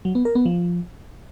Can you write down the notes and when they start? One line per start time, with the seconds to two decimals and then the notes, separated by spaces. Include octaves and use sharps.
0.05 F#3
0.15 B3
0.25 A#4
0.35 B3
0.45 F3